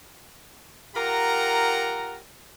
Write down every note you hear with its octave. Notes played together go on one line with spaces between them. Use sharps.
F4 G4 A#4 F#5 A#5